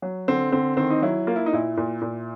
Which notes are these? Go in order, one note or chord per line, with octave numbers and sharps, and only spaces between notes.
F#3
D3 C4
D3 C4
D#3 C4
D#4
F#3 E4
A#3 F4
E4
D#4
A#2 E4
A#2
A#2